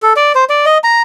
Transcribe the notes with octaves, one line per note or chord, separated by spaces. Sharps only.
A4
D5
C5
D5
D#5
A#5